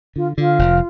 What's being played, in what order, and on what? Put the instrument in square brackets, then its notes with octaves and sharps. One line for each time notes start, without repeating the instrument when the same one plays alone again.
[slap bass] D3 [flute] F4
[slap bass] D3 [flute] F4
[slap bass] F1